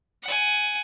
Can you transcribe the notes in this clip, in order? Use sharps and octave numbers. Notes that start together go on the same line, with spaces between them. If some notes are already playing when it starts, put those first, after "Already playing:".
F#5 G#5